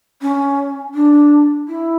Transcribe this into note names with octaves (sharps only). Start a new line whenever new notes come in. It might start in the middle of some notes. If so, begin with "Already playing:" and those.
C#4
D4
E4